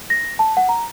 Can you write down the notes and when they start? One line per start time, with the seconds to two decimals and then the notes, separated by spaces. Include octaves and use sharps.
0.10 A#6
0.39 A5
0.57 F#5
0.69 A#5